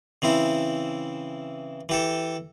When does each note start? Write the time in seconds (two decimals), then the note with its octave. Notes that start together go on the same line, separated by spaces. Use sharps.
0.22 C#3 E3 C4 E4
1.89 E3 G4 A4